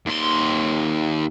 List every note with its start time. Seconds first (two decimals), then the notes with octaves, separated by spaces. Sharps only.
0.06 D#2 C6